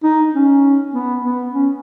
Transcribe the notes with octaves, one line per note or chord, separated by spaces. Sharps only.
D#4
C#4
B3
B3
C#4